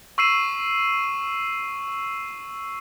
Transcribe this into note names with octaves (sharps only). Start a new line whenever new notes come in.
C#6 E6 C7 D#7 E7